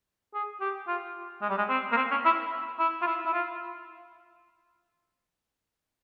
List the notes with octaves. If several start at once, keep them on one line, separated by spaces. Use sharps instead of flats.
G#4
G4
F4
G#3
G3
G#3
C4
A#3
C4
C#4
E4
E4
F4
E4
E4
F4